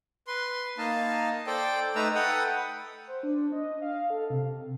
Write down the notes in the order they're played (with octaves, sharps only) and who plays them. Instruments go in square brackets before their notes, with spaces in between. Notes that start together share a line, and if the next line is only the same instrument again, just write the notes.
[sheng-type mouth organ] B4 C6
A#3 D#4 D#5 F5 A5
A4 C5 D5 G5
A3 D#4 B4 A#5 E6
A4 B4 F#5 G5 D#6
[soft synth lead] C5
D4
D#5
F5
A4
C3